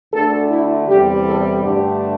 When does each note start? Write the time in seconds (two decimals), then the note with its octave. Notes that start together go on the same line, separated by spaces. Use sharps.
0.12 D2 D3 A3 D4 A4
0.49 E4
0.86 E2 C3 G3 G4
1.23 A4
1.61 G2 D3 A3 D4 G4